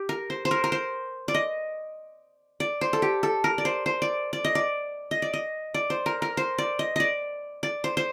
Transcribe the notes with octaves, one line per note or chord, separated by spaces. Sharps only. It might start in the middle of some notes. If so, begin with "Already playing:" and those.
Already playing: G4
A#4
C5
C5
A#4
A#4
C5
D5
D#5
D5
C5
A4
G4
A4
A#4
D5
C5
C5
D5
D5
D#5
D5
D#5
D5
D#5
D5
C5
A#4
A#4
C5
D5
D#5
D5 D#5
D5
C5
C5